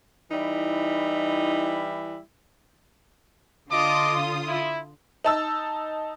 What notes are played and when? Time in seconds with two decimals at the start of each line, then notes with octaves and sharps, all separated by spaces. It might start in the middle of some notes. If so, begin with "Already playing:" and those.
0.31 E3 G3 D#4 E4
3.71 D3 F4 D#5 A5 D6 D#6
4.47 E4
5.24 D#4 A5 E6